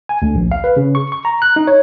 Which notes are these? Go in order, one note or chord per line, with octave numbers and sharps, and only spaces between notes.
G#5
D2
A#1
F5
B4
C#3
C#6
C#6
A#5
F#6
D#4
C#5